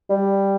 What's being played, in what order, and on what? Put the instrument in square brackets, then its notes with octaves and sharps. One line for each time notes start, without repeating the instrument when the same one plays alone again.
[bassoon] G3